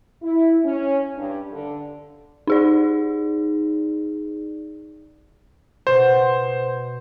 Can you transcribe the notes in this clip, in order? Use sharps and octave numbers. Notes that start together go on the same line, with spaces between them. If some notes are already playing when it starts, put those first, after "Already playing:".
E4
C#4
G2
D3
D#4 G#4 D5
B2 C5